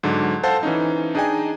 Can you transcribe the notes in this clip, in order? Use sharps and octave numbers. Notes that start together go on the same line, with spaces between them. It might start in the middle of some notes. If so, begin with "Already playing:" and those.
G#2 D3 F#3
A4 C5 F5 F#5 A5
E3 C#4 D#4
D4 D#4 G#4 D#5 G5 G#5